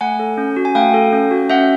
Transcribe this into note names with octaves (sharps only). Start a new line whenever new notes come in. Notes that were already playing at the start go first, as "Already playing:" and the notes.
A3 F#5 G#5
A4
C#4
F#4
G#5
A3 F5 G5
A4
C#4
F#4
C#4 E5 F#5